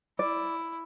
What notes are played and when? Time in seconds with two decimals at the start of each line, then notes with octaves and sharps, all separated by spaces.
0.19 E4 D5